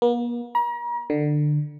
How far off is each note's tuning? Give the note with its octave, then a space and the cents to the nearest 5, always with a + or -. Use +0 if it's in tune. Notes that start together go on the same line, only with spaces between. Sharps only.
A#3 +45
A#5 +40
D3 +20